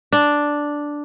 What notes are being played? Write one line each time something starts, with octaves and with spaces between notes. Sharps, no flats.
D4